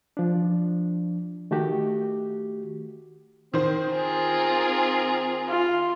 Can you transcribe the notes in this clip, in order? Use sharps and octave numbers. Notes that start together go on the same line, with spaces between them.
F3 D4
D#3 A3 F#4 G4
D#3 C4 C5
F4 G#4 A#4
F4